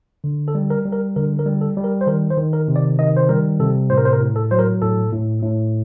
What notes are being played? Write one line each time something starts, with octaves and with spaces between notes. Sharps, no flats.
D3
A4
G3
A#4
G3
A#4
D3 A#4
A#4
G3
A4
G3
A#4
C5
D#3 A#4
C5
D#3
A#4
C3
D5
D#3 D#5
C5
G3 A#4
C3 A4
A2 C5
A#4
C5
A#4
A2
A4
F#3 C5
A#4
A2 A4
A2
A2